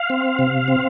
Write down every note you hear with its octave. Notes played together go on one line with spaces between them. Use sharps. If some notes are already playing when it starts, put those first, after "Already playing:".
Already playing: F5
C4
C3
C4